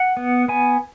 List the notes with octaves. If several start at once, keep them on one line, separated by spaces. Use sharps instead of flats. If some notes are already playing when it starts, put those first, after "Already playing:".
Already playing: F#5
B3
B3 G#5